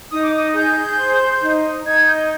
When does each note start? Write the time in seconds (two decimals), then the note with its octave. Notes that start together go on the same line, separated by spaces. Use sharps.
0.10 D#4 D#6
0.22 D6
0.33 D#6
0.54 G#4 G6
0.97 C5
1.41 D#4
1.84 D#4 G#6
2.06 G6